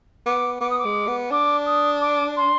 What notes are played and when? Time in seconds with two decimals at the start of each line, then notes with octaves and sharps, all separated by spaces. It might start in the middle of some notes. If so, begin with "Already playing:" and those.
0.26 B3 D6
0.61 B3 D6
0.70 D#6
0.79 D6
0.85 G#3
1.08 B3
1.31 D4 D6
1.66 D#6
2.01 D6
2.37 C6